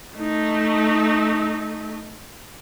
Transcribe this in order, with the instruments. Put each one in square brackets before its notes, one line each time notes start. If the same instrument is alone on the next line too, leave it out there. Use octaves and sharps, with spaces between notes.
[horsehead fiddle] A3 D#4